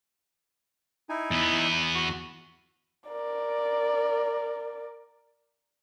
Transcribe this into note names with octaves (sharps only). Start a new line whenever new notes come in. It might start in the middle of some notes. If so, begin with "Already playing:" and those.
D#4 E4 G#5
E2 B3
F#4
A#4 D5